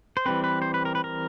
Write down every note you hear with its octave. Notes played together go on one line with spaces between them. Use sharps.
C5
E3 G3 C4 B4
B4
C5
B4
A#4
B4
A#4